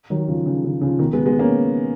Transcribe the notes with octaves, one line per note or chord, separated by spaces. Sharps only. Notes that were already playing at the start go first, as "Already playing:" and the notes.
D#3 F#3
C#3 F3
C#3
C#3
C#3 F3
B2 D#3
G#3 B3
G#3 B3
A#3 C#4